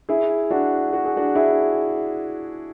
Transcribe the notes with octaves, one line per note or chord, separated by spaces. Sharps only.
E4 G#4
D4 F#4
F#4
G#4
D4 F#4
E4 G#4